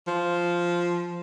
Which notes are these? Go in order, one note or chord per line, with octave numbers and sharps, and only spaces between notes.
F3